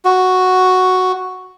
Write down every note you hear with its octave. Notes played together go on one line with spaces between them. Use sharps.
F#4